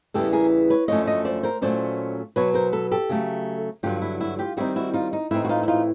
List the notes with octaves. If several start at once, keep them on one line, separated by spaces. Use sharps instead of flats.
E2 C#3 E3 G3 B3 G4 A4
G#4 A#4
B4 C#5
F#2 D3 F3 A3 C#4 C#5 D#5
C#5 D#5
C5 D5
A#4 C5
A#2 F#3 A3 C#4 C5 D5
B2 F#3 B3 B4 C#5
A#4 C5
A4 B4
G4 A4
C#3 F#3 A3
G2 D3 F#3 F4 G4
E4
E4 F#4
F4 G4
D#3 G3 C4 D#4 E4 F#4
E4 F#4
D#4 F4
D#4
A2 E3 A3 C4 D#4 E4
F#4
D#4 F4
E4
D#4 F4